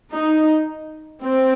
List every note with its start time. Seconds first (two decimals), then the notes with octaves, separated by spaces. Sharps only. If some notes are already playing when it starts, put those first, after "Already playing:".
0.13 D#4
1.23 C4